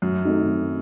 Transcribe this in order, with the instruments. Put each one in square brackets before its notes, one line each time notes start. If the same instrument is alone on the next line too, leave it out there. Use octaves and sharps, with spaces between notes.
[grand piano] F#2 [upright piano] F#3
[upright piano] A3 C4 D#4 F#4
F#3